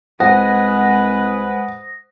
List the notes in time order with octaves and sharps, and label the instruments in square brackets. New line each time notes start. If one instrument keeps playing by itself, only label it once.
[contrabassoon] C2 [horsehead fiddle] G#3 B4 [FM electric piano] C5 D#6 A#6 [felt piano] F#5